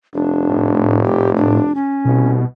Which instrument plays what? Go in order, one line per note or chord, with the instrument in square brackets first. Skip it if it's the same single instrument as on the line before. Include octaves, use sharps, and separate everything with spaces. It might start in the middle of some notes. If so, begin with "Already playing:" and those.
[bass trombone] F1 [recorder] D4
[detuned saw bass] A2
[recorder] G4
D4
C#4
[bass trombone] C2 [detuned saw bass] B2